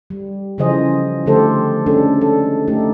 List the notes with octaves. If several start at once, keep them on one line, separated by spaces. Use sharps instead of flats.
G3
C#3 E3 F3 G#4 C5 D#5
D3 F3 A3 G4 A4 C5
G#3 C#4 D4 A4
A4
A3 D#4 G4